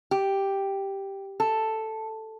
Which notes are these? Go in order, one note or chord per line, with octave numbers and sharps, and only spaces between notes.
G4
A4